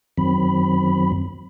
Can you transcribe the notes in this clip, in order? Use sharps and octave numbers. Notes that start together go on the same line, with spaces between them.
F#2 D#3 F#3 C4 B5